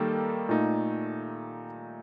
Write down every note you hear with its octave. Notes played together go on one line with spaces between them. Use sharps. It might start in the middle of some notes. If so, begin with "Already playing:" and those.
Already playing: D#3 G3 A#3 D#4 A4
A#2 A3 D#4